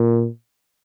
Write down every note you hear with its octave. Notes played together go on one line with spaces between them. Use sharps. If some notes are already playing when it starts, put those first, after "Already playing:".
Already playing: A#2